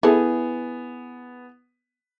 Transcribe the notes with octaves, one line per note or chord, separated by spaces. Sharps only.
B3 E4 G#4 A4